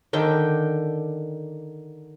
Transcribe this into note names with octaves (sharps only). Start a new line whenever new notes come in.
D3 D#3 D4 G5